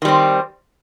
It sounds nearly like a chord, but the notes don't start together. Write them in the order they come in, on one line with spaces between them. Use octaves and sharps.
D#3 G3 C4